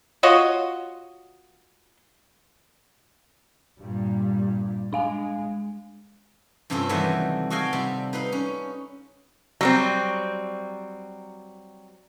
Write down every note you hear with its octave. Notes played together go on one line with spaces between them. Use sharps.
F4 F#4 C#5 D#5
G2 A#2 G3
G#3 D4 F5 G#5
G2 C3 C4 C#4 F4 A4
C3 D#3 E3 F#3 G3 A3
F#4 A4 D#5 F5 G5 G#5
C3 G3
D#4 B4 F5 B5
C#4
F#3 G3 C4